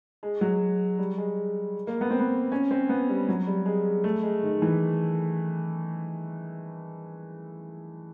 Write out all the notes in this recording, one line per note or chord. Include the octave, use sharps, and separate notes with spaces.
G#3
F#3
G3
G#3
A#3
B3
C4
B3
C#4
C4
B3
G3
F#3
G3
G#3
A3
G#3
D#3
E3